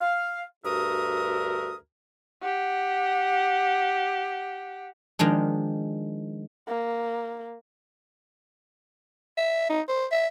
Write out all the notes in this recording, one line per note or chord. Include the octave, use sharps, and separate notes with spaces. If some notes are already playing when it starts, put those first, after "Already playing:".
F5
D2 G2 F#4 A#4 E5 D#6
G4 F#5
D#3 F3 G#3 D4
A#3
E5
D#4
C5
E5